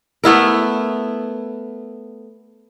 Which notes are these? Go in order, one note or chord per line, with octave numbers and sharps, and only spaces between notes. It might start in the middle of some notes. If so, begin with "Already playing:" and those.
A3 B3 E4 A#4